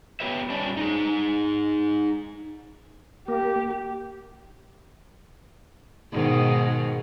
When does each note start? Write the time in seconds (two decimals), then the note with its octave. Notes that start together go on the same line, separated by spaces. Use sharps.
0.20 B3 G4 B4 C#5 E5
0.50 G3 C#4 D4 D5
0.77 D#4 G#4
3.28 A#3 G4
6.13 G#2 B2 D#3